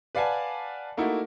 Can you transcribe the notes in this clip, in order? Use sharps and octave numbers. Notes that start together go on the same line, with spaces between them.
B4 D5 F5 F#5 G#5 A5
A3 A#3 D#4 E4 F#4